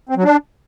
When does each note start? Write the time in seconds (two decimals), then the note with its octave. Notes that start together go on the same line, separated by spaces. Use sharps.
0.09 C4
0.17 F#3
0.24 D4